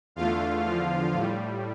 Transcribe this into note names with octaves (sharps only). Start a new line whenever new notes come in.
E2 D3 A3 F4 F5
E2 D3 F3
A2 G3